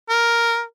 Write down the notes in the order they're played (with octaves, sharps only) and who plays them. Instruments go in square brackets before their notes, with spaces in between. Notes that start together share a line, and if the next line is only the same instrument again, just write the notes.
[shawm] A#4